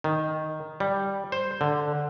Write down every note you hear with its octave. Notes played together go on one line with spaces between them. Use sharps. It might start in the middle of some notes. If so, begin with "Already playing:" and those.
D#3
G3
C5
D3